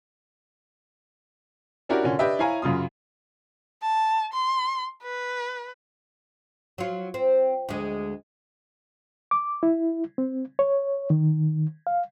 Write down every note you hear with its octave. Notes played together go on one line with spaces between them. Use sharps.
C#4 D4 E4 F#4 G4 A#4
A#2 D3 C#4
D4 G4 B4 D#5 E5
E4 C#5 F5 G#5 A#5
F#2 C#3 F4 D#6
A5
C6
B4
F#3 F4
C4
D2 G#3
D6
E4
C4
C#5
D#3
F5